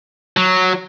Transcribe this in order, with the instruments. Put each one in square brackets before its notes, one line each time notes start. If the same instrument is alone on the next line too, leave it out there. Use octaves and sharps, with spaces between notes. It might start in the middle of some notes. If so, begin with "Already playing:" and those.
[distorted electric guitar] F#3